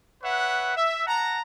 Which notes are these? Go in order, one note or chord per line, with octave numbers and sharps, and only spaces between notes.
B4 C#5 E5 F#5
E5
F#5 A5 A#5